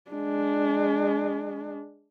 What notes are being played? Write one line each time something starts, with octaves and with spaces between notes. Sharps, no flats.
G#3 D4